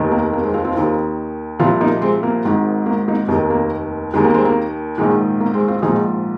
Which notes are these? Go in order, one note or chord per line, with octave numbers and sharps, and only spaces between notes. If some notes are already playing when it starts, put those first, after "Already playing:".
Already playing: F1 D#2 D#3
A#3
A#3
G#3 C4
C4 F4
C4 F4
D#2 D#3
C2 A#2 F3 C4 F4
A#3 D#4
G#3 C4
A#3
G#1 G#2 D#3
A#3
A#3 D#4
F1 D#2 D#3
A#3
D#2 D#3 G#3
A#3
G#3 C4
A#3
A#1 G#2 D#3 G#3
A#3
G#3 C4
C4 F4
A#1 G#2 F3 D#4 G#4